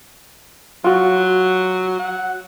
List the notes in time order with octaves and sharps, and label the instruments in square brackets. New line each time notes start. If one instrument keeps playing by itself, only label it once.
[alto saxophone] F#3 [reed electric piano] F4 F#4
[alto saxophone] F#5